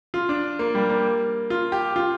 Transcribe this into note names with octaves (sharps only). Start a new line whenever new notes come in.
F4
D4
A#3
G3
A#3
F4
G4
F4